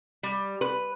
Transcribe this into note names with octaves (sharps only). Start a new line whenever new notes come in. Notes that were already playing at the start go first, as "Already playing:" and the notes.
G3
B4